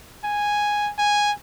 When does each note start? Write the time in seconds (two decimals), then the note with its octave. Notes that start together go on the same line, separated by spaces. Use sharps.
0.24 G#5
0.99 G#5